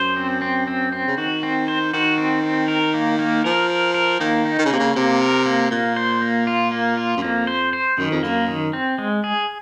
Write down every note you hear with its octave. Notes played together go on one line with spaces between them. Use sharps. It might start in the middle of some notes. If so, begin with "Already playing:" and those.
Already playing: F#2 C5
C4
C4
C4
C4
C#3
D#3 F#4
C4
C5
D#3 F#4
C4
C4
A#4
A#3
A#3
F3 A#4
A#4
A#4
D#3 A#3
D#4
D#3
C#3
C3 A#3
C#3
C3 A#3
A#4
A#3
A#2 A#3
C5
A#3
F4
A#3
F4
F#2
F2 A#3
C5
C5
F#2 D#3
F2
F#2 A#3
D#3
C4
G#3
G#4